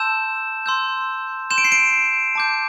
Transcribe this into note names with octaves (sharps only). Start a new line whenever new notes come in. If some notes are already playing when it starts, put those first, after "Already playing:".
Already playing: A5 C6 E6 G6 E7
C6 E6 G6
C6 G6 E7
D7
C7
D7
A5 D6 G6